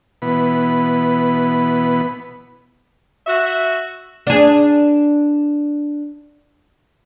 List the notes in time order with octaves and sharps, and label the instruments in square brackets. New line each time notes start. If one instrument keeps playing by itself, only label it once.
[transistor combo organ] B2 E3 B3 B5
[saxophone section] F#4 E5
[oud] D4 G#4